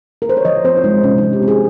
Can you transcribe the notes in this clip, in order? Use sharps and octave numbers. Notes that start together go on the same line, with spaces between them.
A#4
C5
C#5
F3 D#5
C4 C5
F4
G#3 D#4
C3 C#4
D#4
F3
G4
C4
G#4